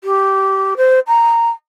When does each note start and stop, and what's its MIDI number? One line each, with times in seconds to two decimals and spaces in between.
0.04 0.74 67
0.77 0.99 72
1.07 1.50 82